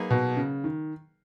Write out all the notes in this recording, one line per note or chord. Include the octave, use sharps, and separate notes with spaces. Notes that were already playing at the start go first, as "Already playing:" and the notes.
Already playing: F#3 A#3 D#4 G#4 B4
B2
C#3
D#3